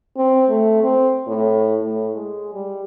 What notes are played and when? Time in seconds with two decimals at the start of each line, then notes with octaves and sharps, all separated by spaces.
0.17 C4
0.49 A3
0.83 C4
1.27 A2
1.82 A2
2.15 G#3
2.54 G3